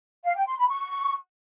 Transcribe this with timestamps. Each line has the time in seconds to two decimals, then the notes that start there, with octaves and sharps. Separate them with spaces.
0.24 F5
0.35 G5
0.46 C6
0.57 B5
0.68 C#6